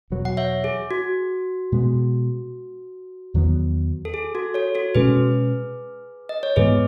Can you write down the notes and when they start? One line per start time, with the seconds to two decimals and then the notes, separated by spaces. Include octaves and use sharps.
0.10 E2 B2 F#3
0.25 F#5
0.37 C#5 E5
0.64 G#4
0.91 F#4
1.72 B2 G#3 B3
3.34 E2 D#3 F#3 B3
4.05 A4
4.14 G#4
4.35 F#4 A4
4.54 A4 C#5
4.75 F#4 A4
4.95 B2 G#3 C#4 G#4 B4
6.29 D#5
6.43 C#5
6.56 G#2 E3 G#3 B3 G#4 B4